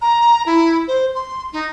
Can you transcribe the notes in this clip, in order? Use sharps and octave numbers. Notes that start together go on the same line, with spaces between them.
A#5
E4
C5
C6
D#4